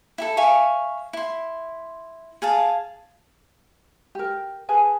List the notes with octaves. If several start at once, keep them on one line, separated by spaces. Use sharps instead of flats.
E4 G4 A4
E5 F5 G#5 C#6
E4 C6
G#4 F5 A5
G4 A#4
G#4 B4 G#5 A5